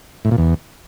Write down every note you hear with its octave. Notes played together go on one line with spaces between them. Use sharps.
A2
A#2
E2